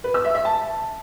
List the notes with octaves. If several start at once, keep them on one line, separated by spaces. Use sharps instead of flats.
B4
E6
E5
E5
A5